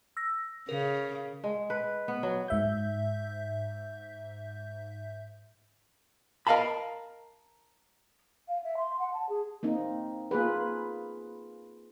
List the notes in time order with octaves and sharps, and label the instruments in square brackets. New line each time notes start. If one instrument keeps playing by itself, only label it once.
[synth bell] E6 A#6
[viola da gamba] C#3 [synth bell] A#4
[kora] G#3
B4
B3
F#3
[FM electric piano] G#2 E5 G6
[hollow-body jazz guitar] A#4 D#5 F5 A5 B5
[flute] F5
E5
C6
F#5
A5
G#4
[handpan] A#3 C4 D#4
A#3 F4 G#4 B4